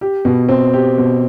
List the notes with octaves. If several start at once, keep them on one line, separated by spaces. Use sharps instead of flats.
G4
B2
C4
G4
B2